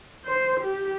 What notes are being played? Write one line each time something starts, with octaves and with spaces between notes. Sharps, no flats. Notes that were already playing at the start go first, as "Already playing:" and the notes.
C5
G4